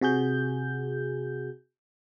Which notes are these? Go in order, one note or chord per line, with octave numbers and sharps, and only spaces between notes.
C3 F#4 G#4 G6